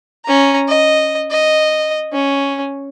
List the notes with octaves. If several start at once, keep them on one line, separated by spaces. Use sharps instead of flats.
C#4 A#5
D#5
D#5
C#4